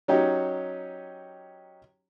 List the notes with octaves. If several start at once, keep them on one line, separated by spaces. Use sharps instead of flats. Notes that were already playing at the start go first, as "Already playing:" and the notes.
F#3 C#4 D#4 G4